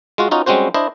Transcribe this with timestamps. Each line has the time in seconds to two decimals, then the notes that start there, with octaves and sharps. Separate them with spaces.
0.18 G#3 F4 F#4
0.31 C#4 D#4 F4 F#4
0.46 G3 G#3 C4 C#4 F#4 C5
0.74 D4 E4 C5 D#5